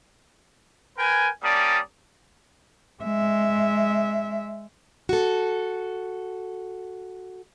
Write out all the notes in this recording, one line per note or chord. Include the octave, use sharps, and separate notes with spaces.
A#4 B4 G5 G#5
G3 A#3 C#4 D5 A5 D#6
G#3 E5
F#4 A4